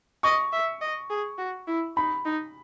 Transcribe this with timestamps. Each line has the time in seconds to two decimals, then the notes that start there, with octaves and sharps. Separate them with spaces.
0.23 D#5 C#6
0.53 E5
0.81 D#5
1.10 G#4
1.38 F#4
1.67 E4
1.96 D#4 B5
2.25 D#4